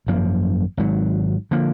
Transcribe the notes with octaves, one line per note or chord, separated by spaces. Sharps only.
G#1 F#2 F3 A#3
G#1 G#2 F#3
D3 F3 A#3